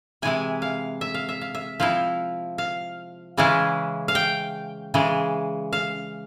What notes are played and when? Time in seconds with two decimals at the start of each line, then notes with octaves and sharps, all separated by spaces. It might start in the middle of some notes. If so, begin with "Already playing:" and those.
0.22 C3 E3 G#3 E4 G#5
0.62 F5
1.01 E5
1.14 F5
1.29 E5
1.41 F5
1.55 E5
1.80 F3 C4 E4 F5
2.58 F5
3.37 C#3 E3 G#3 C#4 E4
4.08 F5
4.15 G5
4.94 C#3 E3 G#3
5.73 F5